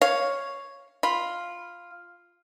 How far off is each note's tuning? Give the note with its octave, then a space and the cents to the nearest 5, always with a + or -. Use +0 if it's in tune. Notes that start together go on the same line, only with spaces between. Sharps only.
C#5 +0 F5 +0
F4 +0 B5 +0